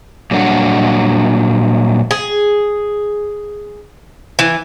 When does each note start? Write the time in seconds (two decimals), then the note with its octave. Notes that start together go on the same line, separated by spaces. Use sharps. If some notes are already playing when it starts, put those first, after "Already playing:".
0.31 A#2 F#3 G3 D4 A4 F#5
2.11 G#4
4.39 E3